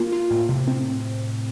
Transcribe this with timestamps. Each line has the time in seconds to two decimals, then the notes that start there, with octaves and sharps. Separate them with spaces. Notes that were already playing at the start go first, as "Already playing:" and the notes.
Already playing: A#3 F4
0.12 F4
0.31 A2
0.49 C3
0.68 C4